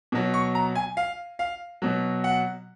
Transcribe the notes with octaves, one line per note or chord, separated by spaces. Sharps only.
B2 F#3
C#6
A#5
G#5
F5
F5
B2 F#3
F#5